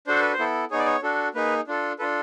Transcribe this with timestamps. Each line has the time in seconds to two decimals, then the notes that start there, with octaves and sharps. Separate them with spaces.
0.07 D4 F#4 A4 C5
0.20 B4
0.33 C5
0.39 B3 E4 A4
0.71 B3 D#4 G#4 C#5
0.79 D5
0.86 C#5
1.03 D4 F#4 A4
1.34 A#3 D#4 G#4 B4
1.67 D4 F4 A4
1.99 D4 F4 A4 B4